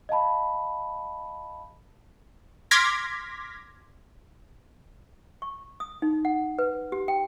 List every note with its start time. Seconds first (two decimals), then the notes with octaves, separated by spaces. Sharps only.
0.09 D#5 F5 A5 B5
2.71 C6 D6 F6 G#6 A#6 B6
5.42 C#6
5.80 D#6
6.02 D#4
6.25 F#5
6.59 B4
6.92 G4
7.08 G5